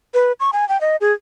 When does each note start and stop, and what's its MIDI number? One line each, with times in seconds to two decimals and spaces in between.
0.14 0.32 71
0.40 0.50 85
0.53 0.67 80
0.69 0.80 79
0.81 0.96 75
1.01 1.13 68